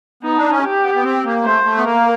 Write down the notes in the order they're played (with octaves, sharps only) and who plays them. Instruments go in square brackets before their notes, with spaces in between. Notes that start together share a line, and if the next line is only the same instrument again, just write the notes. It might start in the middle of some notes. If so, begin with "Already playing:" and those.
[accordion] B3 [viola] D#4
[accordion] D4
C#4
[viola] G4
[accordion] B3
B3
C4
A#3
[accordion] A3 [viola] C5
[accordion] A3
B3
[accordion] A#3 [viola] A#4